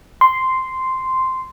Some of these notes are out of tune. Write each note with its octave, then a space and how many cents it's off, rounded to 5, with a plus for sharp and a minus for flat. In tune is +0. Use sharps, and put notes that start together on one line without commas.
C6 -5